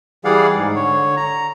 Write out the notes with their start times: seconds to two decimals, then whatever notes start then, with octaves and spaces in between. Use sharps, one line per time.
0.25 E3 G3 G#4 D5 F5 F#5
0.57 G#2
0.76 D3 C#5
1.17 A#5